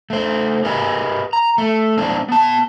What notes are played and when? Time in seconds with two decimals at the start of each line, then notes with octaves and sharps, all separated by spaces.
0.10 A3 C5
0.65 G4 A#4 B4 D#5 G#5
1.33 A#5
1.58 A3
1.97 G#3 C4 D4 C5
2.28 B3 A5